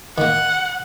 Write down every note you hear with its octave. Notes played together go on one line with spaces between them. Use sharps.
D#3 A#3 F#5